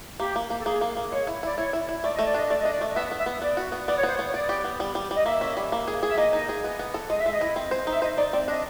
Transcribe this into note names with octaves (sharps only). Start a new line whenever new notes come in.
A#3 G4
A#3
A#3
A4
A#3 G#4
A#3
A#3
G#3 C#5
E4
E4 D5
E4 C#5
E4
E4
A3 D5
A3 D#5
D5
D4 D#5
A3 D5
D4 D#5
D5
A3
B3 E5
B3
E5
B3
B3 D5
F#4
B3
B3 D5
C#5
B3 C5
C#5
B3
C#5
B3 D5
G4
B3
G3
G3
G3
D#5
A#3 E5
C#4
G3
A#3
G#4
G#4
E5
A#3 D#5
D#4
G#4
B3
B3
A4
G#3 D#5
E5
G#3
D#5
E4
C4
C5
D#4 E5
C5 D#5
D#4 D5
C4 D5
D4 D#5